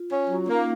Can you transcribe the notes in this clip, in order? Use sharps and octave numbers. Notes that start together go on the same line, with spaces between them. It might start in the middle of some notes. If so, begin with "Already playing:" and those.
Already playing: F4
C#4
F#3 F4
C#4
A#3 D#4